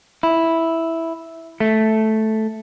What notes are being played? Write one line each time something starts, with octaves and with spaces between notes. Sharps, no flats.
E4
A3